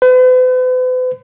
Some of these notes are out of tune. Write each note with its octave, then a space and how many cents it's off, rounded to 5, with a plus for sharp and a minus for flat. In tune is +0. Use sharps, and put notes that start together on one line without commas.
B4 +45